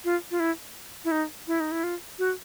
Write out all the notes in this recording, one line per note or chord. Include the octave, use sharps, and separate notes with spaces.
F4
F4
E4
E4
D#4
E4
D#4
E4
F4
F#4